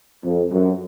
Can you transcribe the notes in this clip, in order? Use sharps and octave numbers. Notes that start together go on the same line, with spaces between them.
F2
F#2